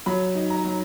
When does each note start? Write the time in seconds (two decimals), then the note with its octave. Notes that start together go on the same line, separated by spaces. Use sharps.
0.06 F#3 B5
0.35 D#4
0.50 A#5
0.65 F#3